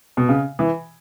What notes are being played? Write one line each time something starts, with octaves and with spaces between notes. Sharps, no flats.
B2
C#3
E3